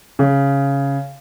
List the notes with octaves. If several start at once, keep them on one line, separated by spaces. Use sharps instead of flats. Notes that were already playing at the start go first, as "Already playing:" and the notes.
C#3